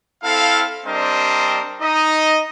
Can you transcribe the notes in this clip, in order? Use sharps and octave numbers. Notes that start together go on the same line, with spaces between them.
C4 E4 A4 F5
G3 C4 D4 A#4 C5 D#5
D#4 D#5